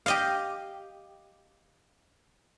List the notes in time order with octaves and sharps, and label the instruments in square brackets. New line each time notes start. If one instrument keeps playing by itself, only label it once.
[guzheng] G4 D#5 F5